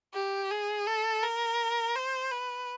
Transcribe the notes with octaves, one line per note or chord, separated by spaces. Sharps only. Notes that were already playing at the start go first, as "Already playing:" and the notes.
G4
G#4
A4
A#4
C5
B4